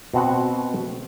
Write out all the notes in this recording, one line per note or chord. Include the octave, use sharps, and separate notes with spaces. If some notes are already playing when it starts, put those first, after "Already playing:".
B2 C4 F#4 F#5